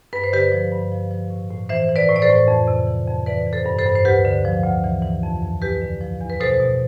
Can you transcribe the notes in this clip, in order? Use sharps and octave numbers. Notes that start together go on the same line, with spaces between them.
G2 B4
C5
D3 G4 B4
F3
G2
F3
F3
A2
A2
E3 C5 E5
E3
B4 D5
A2
D5
A4 C5
A2
F2
C3
E3
F2
E3 B4 D5
E3
A4 C5
G2
A4 C5
G2
C5
D2 G4 B4
D3
F3
D2
E3
E3
F2
F2
E2 G4 B4
D3
F3
E2
B4
B2 A4 C5
B2